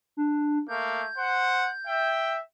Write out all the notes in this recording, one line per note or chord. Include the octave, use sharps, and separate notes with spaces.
D4
A3 A#3 G6
C5 F#5
E5 G5